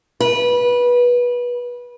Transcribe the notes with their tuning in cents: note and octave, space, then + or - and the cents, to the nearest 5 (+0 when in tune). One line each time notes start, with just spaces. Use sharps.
B4 -20